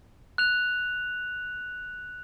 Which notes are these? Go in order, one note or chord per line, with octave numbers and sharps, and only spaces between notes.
F#6 F7